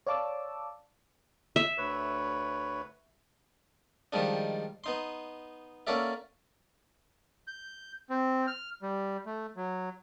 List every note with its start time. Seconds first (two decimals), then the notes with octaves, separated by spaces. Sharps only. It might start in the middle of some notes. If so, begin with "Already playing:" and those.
0.07 C#5 D5 F5 A5 D6 E6
1.56 E5
1.78 D2 B4 C#5
4.12 D#3 F3 G3 G#3 D4
4.84 B3 D#4 C6
5.87 A#3 C#4 F#4 A4 D5 E5
7.47 G6
8.10 C4
8.47 F6
8.82 G3
9.26 A3
9.56 F#3